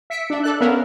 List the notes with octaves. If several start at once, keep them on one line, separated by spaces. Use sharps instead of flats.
E5 B6 C#7 D7
D4 E5
A4 D5 F#6
B3 C#4 A#4 E5 F5